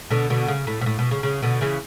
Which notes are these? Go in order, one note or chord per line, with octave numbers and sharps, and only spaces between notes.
B2 D3
B2 D3
C#3
A2
B2
A2
B2
C#3
C#3
B2 D3
C#3 E3